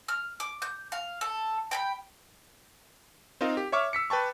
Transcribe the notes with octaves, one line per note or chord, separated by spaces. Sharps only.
F6
D6
G6
F5
A4
G5 G#5 B5
C4 D#4 F4 A#4 D#5 F5
G4
C#5 E5 C#6 D6 F6
E6 B6 C#7
B4 G5 A5 C#6